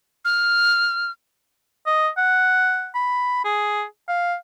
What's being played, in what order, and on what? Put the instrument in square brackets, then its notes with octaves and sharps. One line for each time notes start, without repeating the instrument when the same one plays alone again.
[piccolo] F6
[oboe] D#5
F#5
B5
G#4
F5